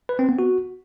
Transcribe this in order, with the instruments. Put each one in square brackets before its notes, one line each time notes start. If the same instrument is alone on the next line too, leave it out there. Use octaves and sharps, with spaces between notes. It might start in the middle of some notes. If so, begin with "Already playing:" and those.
[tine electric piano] B4
C4
B3
F#4